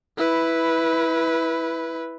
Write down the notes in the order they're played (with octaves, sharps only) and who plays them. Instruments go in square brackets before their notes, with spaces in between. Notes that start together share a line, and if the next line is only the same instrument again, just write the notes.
[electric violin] E4 B4